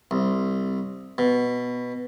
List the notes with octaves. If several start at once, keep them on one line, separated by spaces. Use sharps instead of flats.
C2
B2